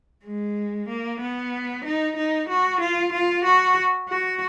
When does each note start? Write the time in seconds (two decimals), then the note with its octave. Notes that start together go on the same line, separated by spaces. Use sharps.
0.25 G#3
0.88 A#3
1.21 B3
1.84 D#4
2.16 D#4
2.49 F#4
2.80 F4
3.12 F4
3.44 F#4
4.09 F#4